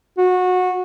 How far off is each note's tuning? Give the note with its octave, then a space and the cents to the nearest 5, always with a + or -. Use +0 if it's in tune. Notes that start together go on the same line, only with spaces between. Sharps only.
F#4 -20